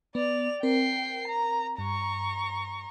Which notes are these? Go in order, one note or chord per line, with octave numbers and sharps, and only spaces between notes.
B3 D5 F7
C4 A#4 G5 C7
A#5
G2 A#5 C#6